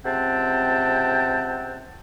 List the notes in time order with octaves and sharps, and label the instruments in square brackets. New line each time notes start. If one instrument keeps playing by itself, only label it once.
[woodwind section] C#2 C3 C4 F#5 G5 A5